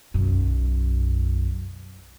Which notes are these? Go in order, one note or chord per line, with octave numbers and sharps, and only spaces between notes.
B1 F#2